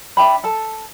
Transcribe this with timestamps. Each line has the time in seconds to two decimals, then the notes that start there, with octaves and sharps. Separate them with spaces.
0.17 D4 E5 G5 B5
0.44 A4 A5